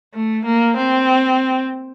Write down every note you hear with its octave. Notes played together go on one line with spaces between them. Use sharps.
A3
A#3
C4